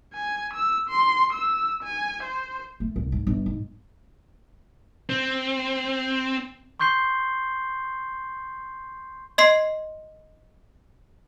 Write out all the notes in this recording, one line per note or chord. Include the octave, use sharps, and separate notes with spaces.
G#5
E6
C6
E6
G#5
C5
A3
C2
G#2
G1
G#2
C4
C6 C#6 G6 C7 G7
D#5 C6 C7